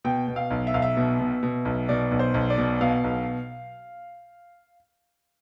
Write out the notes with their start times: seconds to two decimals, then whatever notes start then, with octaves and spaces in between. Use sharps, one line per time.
0.04 B2 G5
0.28 B2
0.36 F5
0.50 B1
0.67 E5
0.74 B1 F5
0.82 E5
0.97 B2
1.20 B2
1.43 B2
1.65 B1
1.89 B2 D5
2.11 B1
2.19 C5
2.34 B1
2.50 D5
2.58 B2
2.81 B2 F5
3.04 B1